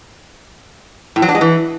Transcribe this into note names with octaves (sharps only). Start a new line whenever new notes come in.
A2
F#3
D4
G#3
E3